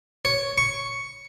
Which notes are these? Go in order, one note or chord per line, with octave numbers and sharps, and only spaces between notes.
C#5
C#6